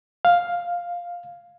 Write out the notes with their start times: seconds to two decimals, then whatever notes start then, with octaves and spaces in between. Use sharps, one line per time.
0.25 F5